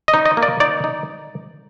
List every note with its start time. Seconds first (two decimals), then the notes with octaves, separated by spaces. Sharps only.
0.08 D#5
0.14 D#4
0.25 D#5
0.37 A#3
0.42 D5
0.60 D#4 D5
0.84 D#4